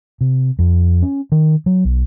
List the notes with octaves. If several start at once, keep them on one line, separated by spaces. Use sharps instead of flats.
C3
F2
C#4
D#3
F#3
B1